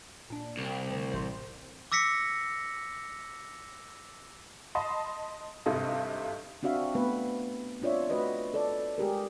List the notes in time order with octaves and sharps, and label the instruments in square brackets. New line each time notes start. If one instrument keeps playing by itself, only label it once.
[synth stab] A#2 D4
[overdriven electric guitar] C2
[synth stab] D2
A1 C5
[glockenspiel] D6 E6 A#6 B6 C#7
[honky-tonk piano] D#5 A5 B5 C6
G#1 G2 C3 A4 D#5
[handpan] C4 D4 F#4 E5 F5
A3 B3 B4
C4 D4 F4 C#5 D5 E5
A3 F#4 B4 D#5
A4 D5
G#3 G4 G#4 A#4